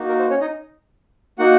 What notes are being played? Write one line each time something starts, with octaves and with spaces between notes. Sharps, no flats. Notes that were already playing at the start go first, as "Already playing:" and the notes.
Already playing: A#3 D#4 F#4
A#4
C5
C#4 C#5
D#4 D#5
A#3 D#4 F#4 F#5